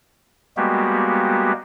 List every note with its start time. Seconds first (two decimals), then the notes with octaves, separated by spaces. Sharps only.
0.57 G3 G#3 A#3 B3 F#4 G4